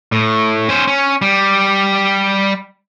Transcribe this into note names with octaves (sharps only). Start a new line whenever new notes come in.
A2
C#4 C5
C#4
G3